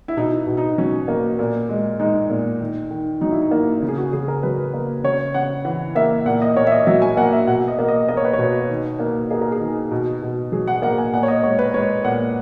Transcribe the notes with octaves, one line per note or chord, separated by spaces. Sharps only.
E4
B2 D#4
B2
D#4
F#3 C#4
A#3
A#2
G#3
G#3 D#4
A#2
D#3
D#3
F#3 D#4
E4
D#4
A#3
C#3
G#4
F#4
C#3 G#4
A#4
F#3 B4
A#3
C#3 C#5
C#3 F#5
E3 F#5
A#3 E5
A#2 F#5
D#5
A#2 C#5
E5
D#5
F#3 E5
G#5
A#3 F#5
E5
B2 F#5
D#5
A#3
D#5
A#3 D#5
C#5
B4
C#5
B2
D#3
A#3
A#3 G#4
A#4
G#4
D#3
B2
B2
F#3 G#4
F#5
A#3 F#5
G#5
A#2 F#5
C#5
D#5
G#3 C#5
B4
G#3 C#5
A#2 F#5